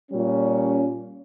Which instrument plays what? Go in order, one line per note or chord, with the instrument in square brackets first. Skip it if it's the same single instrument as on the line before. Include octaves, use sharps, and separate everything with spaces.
[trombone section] A#2 G3 C#4